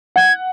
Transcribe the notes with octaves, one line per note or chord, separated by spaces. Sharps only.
F#5 G#6